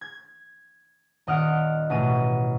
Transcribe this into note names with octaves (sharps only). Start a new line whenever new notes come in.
G#6
D#1 D#5 F#5 F6 D7
A1 B2 D#7